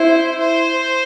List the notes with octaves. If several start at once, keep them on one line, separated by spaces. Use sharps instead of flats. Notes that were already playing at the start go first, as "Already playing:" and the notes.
Already playing: E4 C5
C5